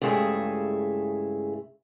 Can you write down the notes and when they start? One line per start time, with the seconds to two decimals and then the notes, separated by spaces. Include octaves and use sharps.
0.02 G2 C#3 G#3 A3 E4 G#4